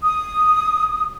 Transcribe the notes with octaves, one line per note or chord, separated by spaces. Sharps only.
D#6